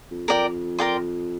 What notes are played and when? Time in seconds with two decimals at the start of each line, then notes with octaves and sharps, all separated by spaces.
0.11 F2
0.28 F2 A#4 D5 G5
0.79 A#4 D5 G5 C6